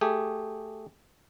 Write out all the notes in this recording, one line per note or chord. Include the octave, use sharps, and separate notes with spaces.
A3 G4 G#4